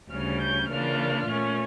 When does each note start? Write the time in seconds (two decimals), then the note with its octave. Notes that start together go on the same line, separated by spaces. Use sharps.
0.10 D2 C#3 G3 C#4 F6
0.40 G6
0.68 C#3 E3 A#3 D4 F4 F6
1.26 A#2 A3 C#4